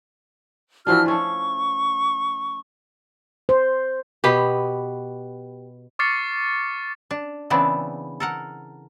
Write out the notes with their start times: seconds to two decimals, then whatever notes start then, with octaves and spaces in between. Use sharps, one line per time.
0.87 E3 F3 D4 F#4 E6 F6
1.06 A3 C#4 F4 C#6
3.49 C5
4.24 B2 B3 G4
5.99 C#6 D6 F6 A6 C7 C#7
7.11 D4
7.50 C#3 E3 B3 C4 D4
8.20 A4 A#4 F#5